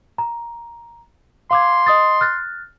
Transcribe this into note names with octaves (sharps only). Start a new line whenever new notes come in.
A#5
F5 C6 D6 G#6
D#5 D#6 A6
F6 F#6 A6